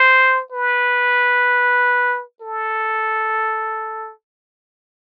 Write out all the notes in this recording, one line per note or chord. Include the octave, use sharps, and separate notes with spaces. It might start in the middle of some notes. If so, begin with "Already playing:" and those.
Already playing: C5
B4
A4